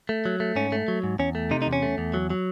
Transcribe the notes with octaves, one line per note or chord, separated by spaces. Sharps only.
A3
F#3
A3
G#2 C#4
A3
F#3
G#2
E2 C#4
A3
C3 D#4
D#4
E2
C#4
A3
E2
F#3
F#3